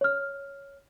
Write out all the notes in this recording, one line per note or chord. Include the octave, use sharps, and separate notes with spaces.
C#5 F6